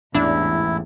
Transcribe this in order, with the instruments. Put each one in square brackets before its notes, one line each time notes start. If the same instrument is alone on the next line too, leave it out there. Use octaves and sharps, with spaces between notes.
[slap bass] A1 G#2 [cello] E2 [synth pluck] D4 [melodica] E4